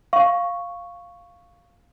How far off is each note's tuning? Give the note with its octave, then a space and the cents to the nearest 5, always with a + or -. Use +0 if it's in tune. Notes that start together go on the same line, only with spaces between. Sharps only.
F5 +0 C#6 +0